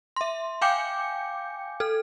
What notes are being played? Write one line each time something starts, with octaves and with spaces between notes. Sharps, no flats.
E5 C6
F5 G5 G#5 D6 G6 C#7
A4 F6